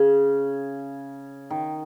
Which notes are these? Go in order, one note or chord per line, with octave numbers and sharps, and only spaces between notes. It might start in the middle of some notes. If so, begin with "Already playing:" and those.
Already playing: C#3
D#3